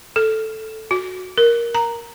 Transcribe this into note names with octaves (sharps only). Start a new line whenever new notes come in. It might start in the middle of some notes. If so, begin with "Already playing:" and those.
A4
F#4
A#4
A#5